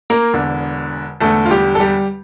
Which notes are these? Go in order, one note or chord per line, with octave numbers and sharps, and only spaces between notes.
A#3 A#4
E1 E2 D3
E1 E2 D3 A3 A4
F4
G3 G4
A4
G3 G4